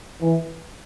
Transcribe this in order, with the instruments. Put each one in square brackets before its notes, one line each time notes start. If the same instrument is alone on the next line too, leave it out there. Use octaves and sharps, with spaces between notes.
[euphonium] E3